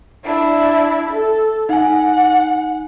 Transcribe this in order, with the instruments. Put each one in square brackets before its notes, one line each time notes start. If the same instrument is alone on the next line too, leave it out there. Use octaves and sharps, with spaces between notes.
[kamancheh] D4 E4
A4
[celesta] D#4 G#5 [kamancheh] F#5